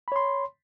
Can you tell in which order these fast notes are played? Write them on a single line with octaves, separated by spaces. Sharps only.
B5 C#5 C6